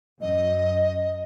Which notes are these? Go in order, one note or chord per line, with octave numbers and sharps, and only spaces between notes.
F#2 D#5